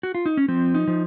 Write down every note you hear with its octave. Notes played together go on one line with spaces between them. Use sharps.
F#4
F4
D#4
C#4
F3 C4
D#4
F3